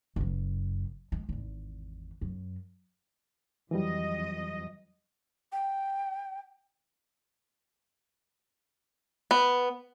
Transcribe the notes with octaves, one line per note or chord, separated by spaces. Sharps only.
F#1 F#2
G#3
G#1 E2
F#2
F2 E3 F#3 G3 D#5
G5
B3